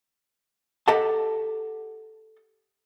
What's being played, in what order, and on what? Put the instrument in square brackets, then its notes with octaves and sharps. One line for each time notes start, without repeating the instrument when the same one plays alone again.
[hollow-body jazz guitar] G4 A4 D#5 F#5 A5